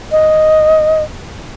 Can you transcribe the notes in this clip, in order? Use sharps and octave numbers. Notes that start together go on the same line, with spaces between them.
D#5